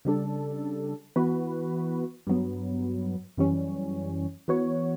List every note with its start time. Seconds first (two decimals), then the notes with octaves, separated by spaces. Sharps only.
0.05 C#3 G3 D4 A4
1.16 E3 B3 F#4 B4
2.27 G2 F#3 B3
3.37 F#2 E3 G3 C#4
4.48 E3 B3 F#4 C#5